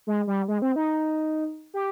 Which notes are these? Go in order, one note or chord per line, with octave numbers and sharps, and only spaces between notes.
G#3
G3
G#3
C4
D#4
G4